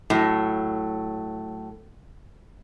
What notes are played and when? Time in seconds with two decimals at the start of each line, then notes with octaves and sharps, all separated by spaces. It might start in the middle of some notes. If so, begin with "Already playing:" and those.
0.10 A2 F#3